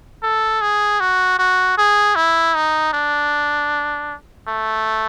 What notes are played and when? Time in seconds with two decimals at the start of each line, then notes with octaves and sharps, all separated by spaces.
0.23 A4
0.61 G#4
1.00 F#4
1.39 F#4
1.78 G#4
2.16 E4
2.55 D#4
2.93 D4
4.48 A3